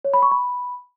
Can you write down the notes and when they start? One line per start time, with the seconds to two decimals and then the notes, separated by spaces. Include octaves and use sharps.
0.05 C#5
0.14 B5
0.22 C#6
0.31 B5